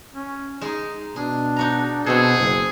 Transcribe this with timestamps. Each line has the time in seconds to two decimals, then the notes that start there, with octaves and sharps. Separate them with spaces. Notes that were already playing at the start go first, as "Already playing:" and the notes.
0.14 C#4
0.61 G#3 D#4 G#4
1.16 B2 D4 G#4
1.56 D#4 F#4 A#5
2.06 B2 C4 F#4 G#4 A4
2.38 F#1